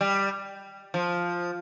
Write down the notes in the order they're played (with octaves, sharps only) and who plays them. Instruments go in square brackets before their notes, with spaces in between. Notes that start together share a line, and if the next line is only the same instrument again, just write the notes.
[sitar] G3
F3